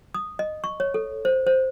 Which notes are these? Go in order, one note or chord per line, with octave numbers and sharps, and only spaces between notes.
D#6
D#5
C#6
C#5
A4
C5
C5